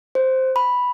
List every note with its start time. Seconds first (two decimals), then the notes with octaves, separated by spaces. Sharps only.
0.15 C5
0.56 B5